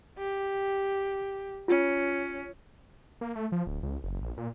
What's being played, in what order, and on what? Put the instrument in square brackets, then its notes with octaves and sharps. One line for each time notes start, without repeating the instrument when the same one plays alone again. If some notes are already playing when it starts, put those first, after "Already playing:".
[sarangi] G4
[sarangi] C#4 [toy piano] F4
[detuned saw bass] A#3
A3
F3
D1
C#2
F#1
A#1
A#2